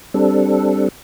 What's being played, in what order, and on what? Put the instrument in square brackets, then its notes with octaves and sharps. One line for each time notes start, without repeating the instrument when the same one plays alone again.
[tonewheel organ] G3 C4 D4 A4